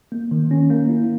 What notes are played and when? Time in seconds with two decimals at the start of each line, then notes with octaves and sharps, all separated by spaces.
0.12 A#3
0.31 D#3
0.51 C#4
0.70 A#3
0.89 E4